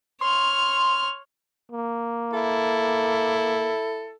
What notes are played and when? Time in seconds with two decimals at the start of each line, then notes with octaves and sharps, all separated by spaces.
0.21 C#5 C6 F6
1.72 A#3
2.33 E4 A4